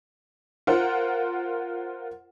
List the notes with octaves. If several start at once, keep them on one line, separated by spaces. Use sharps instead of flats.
F4 A#4 C5 F#5